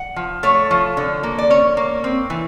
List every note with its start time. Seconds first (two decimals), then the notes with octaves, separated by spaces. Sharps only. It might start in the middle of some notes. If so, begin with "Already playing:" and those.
Already playing: F#5
0.16 F3
0.43 A3 C#5
0.71 F3
0.97 D3
1.23 A#3
1.38 D5
1.50 C#4 C#5
1.77 A#3
2.04 C4
2.30 E3